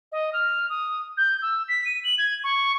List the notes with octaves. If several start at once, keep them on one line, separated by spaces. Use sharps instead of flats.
D#5
F6
D#6
G6
E6
B6
D#7
F#7
G#6
C#6